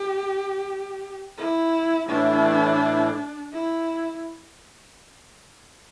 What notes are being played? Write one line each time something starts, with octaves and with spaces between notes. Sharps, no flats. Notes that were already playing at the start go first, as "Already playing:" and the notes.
Already playing: G4
E4
A2 E3 A3 D4 E4
E4